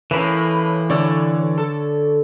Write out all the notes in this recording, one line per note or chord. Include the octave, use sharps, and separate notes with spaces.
A2 E3 A#3 C#4 B4 B5
D3 C#5 D5 E6
A4